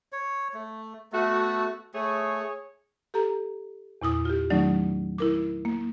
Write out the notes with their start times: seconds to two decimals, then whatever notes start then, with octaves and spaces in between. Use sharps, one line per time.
0.12 C#5
0.54 A3
1.12 A3 B3 F#4 A4
1.94 A3 G#4 C#5
3.14 G4 A4 A#5
4.02 E2 A#2 E4 D#6
4.25 F4 G4
4.50 D#3 F#3 A3 C#4 D#4 D5
5.18 E4 A#4 D6
5.65 A#3